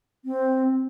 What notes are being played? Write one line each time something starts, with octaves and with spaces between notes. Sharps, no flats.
C4